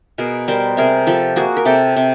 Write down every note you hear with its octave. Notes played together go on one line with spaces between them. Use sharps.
B2 G#4 A#4
G3 A#4 C5
C3 G#4 A#4
F3 G4 A4
A#3 F#4 G#4
A#4
C3 G4 A4
C3